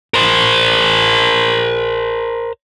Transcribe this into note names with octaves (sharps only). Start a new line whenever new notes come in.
A#4 C5